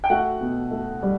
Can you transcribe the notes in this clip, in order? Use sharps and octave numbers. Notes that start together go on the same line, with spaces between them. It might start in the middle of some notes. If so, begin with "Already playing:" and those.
G5
A3 F#4 F#5
B2
A3
G3